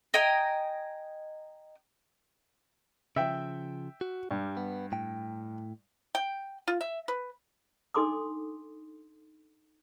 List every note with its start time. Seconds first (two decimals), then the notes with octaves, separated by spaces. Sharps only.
0.14 D#5 G5 G#5 A#5
3.16 C#3 F3 E5 G5
4.01 F#4
4.31 G2 G3
4.57 B3
4.92 A2 G5
6.15 G5
6.68 F4
6.81 E5
7.08 B4
7.94 D4 D#4 A4 C6 D6 D#6